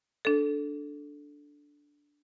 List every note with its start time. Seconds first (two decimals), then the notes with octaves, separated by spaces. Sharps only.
0.25 D4 A4